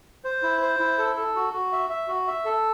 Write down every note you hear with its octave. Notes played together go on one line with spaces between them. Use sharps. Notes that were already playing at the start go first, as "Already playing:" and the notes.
C5
E4
C5
E4
A4
A4
F#4
F#4
E5
E5
F#4
E5
A4